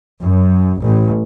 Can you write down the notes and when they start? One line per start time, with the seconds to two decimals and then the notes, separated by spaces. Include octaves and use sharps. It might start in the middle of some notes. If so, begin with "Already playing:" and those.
0.19 F#2
0.80 A1